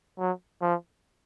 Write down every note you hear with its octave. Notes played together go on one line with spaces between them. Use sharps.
F#3
F3